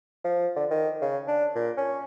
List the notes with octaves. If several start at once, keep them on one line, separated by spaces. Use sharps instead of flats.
F3
D3
D#3
C#3
D4
A#2
C#4